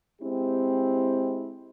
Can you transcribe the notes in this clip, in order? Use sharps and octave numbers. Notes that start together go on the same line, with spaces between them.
G#3 C4 E4 G4